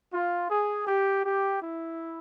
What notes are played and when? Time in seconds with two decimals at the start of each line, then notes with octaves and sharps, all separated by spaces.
0.12 F4
0.50 G#4
0.87 G4
1.25 G4
1.62 E4